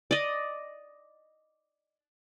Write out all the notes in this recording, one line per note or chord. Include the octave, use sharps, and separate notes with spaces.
D5 D#5